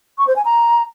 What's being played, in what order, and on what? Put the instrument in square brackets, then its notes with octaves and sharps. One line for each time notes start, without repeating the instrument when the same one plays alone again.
[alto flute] C#6
C5
G#5
A#5